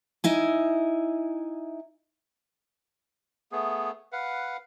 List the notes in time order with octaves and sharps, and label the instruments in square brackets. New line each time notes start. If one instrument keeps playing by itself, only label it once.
[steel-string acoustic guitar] D#4 E4 G#5
[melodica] A3 B3 G#4
B4 F5 F#5